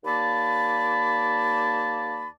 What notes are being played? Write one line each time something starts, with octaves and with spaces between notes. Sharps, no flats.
D#2 A#3 D5 A5 B5